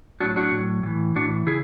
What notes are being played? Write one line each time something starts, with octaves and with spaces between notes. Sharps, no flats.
A2 F#3 D4 F#4
D4 F#4
A2 F#3
A2 E3
A2 E3 D4 F#4
C#3 E4 G#4